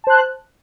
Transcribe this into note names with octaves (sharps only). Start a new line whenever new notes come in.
C5 A5 F#6